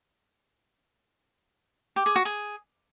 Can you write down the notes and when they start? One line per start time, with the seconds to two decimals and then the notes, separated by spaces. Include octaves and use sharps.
1.96 G4
2.06 G#4
2.16 F#4
2.25 G#4